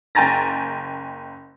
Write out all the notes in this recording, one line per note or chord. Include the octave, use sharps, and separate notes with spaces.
F#1 G5 G#5 A#5 A6 A#6